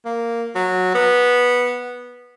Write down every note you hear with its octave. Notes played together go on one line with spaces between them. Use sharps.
A#3
F#3
B3